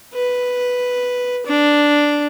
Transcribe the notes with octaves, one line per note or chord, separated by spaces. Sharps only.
B4
D4